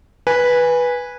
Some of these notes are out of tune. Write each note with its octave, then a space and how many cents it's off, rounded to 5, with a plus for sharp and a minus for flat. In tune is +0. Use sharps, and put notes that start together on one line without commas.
B4 -10 G#5 -10